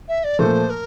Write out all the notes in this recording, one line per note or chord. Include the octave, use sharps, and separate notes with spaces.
E5
D5
A#2 F3 A3 C5
A#4